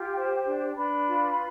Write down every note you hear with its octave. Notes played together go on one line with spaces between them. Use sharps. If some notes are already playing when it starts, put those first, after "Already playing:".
Already playing: F4 G4 G5
C5
D4
D4 B4 B5
F4